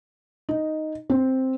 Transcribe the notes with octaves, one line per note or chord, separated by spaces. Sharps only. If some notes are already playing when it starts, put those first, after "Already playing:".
D#4
C4